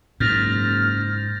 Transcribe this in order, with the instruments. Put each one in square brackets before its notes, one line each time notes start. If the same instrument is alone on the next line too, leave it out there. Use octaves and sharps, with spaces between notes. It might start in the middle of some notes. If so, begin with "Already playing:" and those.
[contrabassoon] F#1 [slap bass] G#2 [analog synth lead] F6 [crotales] G6 A6 A#6